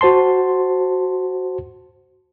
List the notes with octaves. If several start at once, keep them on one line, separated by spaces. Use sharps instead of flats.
F#4 C5 A5 C6